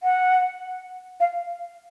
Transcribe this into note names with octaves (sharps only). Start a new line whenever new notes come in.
F#5
F5